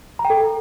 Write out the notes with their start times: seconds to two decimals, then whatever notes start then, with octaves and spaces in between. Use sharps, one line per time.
0.19 A#5
0.25 G5
0.30 A4